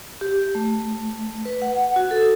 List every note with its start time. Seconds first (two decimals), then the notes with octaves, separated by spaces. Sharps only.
0.21 G4
0.55 A3
1.45 B4
1.62 F#5
1.96 F#4
2.11 A4